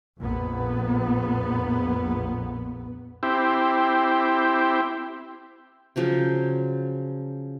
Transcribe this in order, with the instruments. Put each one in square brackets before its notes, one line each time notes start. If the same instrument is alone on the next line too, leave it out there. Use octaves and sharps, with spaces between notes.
[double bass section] A#1 F2 B3
[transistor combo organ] C4 E4 G4
[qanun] C#3 F3 F#3 G5